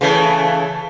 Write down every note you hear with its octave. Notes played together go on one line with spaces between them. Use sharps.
C#3 E3 A3 A5